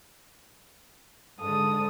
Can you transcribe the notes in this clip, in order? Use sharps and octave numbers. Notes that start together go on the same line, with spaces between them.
G#2 D3 A4 D#6